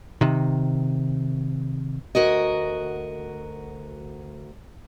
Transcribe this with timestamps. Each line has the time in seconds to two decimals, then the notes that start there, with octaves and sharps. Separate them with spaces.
0.21 C3 D#3
2.15 D2 F#4 A#4 D#5